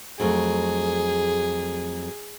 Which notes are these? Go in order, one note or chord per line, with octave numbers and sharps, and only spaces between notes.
F2 F#3 A3 G#4